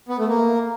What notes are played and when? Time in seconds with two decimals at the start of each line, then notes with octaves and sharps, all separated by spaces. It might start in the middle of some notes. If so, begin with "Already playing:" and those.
0.09 B3
0.19 A3
0.28 A#3